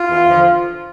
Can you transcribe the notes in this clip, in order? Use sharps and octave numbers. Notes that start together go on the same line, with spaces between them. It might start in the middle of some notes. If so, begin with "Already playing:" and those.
Already playing: F4
E2
D3 F3